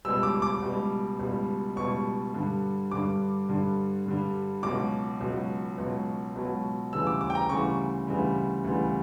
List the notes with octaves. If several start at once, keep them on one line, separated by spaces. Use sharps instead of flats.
C#2 B2 G3 E6
D6
D6
C#2 B2 G3
C#2 B2 G3
C#2 B2 G3 C#6
G2 D3 G3
G2 D3 G3 D6
G2 D3 G3
G2 D3 G3
C#2 B2 F#3 D6
C#2 B2 F#3
C#2 B2 F#3
C#2 B2 F#3
D2 C#3 E3 G3 E6
D6
D6
G5
A#5
D2 C#3 E3 G3 C#6
D2 C#3 E3 G3
D2 C#3 E3 G3